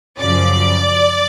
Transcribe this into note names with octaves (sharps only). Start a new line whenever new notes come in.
F#2 C#3 F3 D5